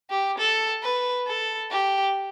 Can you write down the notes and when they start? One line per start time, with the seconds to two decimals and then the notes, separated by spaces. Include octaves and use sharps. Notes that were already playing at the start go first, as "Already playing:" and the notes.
0.10 G4
0.39 A4
0.83 B4
1.27 A4
1.71 G4